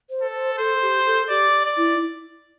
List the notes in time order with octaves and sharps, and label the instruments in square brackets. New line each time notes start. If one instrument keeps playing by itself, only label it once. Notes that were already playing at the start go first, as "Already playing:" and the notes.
[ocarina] C5
[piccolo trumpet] A4
[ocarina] C5
[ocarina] A4 [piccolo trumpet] C5
[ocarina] G4
A4
[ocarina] G4 [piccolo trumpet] D5
[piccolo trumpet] D5
[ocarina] E4